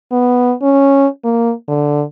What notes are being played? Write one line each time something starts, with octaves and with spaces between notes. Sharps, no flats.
B3
C#4
A#3
D3